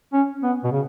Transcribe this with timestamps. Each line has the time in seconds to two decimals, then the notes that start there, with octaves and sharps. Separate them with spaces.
0.13 C#4
0.43 B3
0.64 B2
0.72 C#3